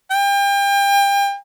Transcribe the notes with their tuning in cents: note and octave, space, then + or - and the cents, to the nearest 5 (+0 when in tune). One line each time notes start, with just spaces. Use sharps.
G5 +35